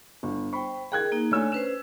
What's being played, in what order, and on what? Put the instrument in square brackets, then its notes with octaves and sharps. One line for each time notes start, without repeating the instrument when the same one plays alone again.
[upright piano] G1
[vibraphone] C5 G5 [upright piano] B5 C#6
[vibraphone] G#4 A#4 [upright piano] G5 F#6 G#6
[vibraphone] A#3 D#4
[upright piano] A3 D4 E6 [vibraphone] C#5 G#5
[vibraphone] C#4 B4 C5 [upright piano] E7